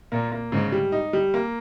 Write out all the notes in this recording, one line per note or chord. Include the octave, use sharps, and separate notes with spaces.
A#2 A#3
A#3
G#2 C#3
G3
D#4
G3
A#3